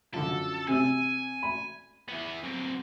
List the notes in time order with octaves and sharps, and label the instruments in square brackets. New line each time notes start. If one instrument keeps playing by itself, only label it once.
[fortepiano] F#2 D3 F3 [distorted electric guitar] A4
[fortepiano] C3 E6 [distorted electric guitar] G#5
[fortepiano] B5
[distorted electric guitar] E3 B3
F#3 C4